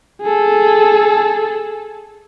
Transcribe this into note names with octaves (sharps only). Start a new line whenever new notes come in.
G#4 A4